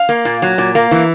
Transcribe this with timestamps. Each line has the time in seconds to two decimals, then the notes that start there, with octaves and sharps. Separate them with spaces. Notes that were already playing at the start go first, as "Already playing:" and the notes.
Already playing: F5
0.09 A#3
0.25 A#2
0.42 F#3
0.58 A#2
0.75 A#3
0.91 E3